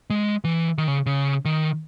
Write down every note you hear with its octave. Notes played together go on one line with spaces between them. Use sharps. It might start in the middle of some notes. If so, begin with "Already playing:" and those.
G#3
E3
D#3
C#3
C#3
D#3